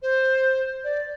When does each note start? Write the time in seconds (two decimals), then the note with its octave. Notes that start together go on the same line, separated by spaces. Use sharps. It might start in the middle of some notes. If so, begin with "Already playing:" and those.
0.02 C5
0.84 D5